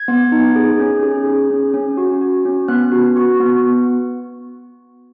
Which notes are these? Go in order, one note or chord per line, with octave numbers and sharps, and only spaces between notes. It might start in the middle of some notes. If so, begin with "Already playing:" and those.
Already playing: G#6
B3
D#4
G#4
C#4
G#4
G#4
C#4
C#4
F#4
F#4
C#4
B3 F#6
F#4
F#4 C#6
B3